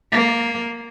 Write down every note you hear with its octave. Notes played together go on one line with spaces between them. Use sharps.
A#3